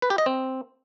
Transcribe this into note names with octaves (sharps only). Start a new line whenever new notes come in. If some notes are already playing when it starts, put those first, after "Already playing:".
B4
G4
D#5
C4